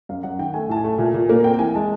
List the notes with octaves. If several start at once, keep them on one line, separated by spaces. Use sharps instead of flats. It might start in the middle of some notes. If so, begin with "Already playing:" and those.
F#2 F5
F#2 F#5
D#3 G5
A3 G#5
A2 A5
G#5
A3
A#2
A#2
A#3
C4 G5
E3 G#5
G#3 A5